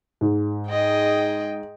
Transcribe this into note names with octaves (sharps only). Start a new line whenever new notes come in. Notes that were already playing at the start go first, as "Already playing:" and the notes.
G#2
G#4 D#5 G5